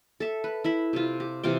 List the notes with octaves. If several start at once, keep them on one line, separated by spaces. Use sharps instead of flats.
A4 E5
B4
E4 E5 B5
C3 F4
G4
C3 E3 F4 G5